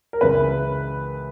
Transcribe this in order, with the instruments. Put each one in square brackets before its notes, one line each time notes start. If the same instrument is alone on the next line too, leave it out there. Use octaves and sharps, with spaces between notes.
[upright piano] A#4
C#2 C#3 E3 B4